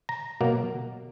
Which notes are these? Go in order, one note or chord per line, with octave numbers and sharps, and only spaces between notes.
A#5
B2 F#3 A#3